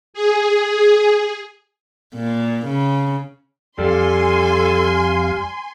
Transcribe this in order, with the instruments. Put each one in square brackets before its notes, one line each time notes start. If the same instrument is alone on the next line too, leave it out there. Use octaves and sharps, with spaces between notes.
[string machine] G#4
[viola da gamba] A#2
C#3
[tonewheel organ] F2 F5 [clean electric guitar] G3 [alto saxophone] A4 [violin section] G#5 C6